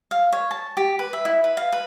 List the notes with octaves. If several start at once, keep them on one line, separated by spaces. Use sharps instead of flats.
F5
C#5
A5
G4
B4
E5
E4
B4
F5
B4